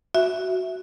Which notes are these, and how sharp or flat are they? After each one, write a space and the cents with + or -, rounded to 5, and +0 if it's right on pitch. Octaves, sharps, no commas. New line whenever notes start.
F#4 +0 E5 +0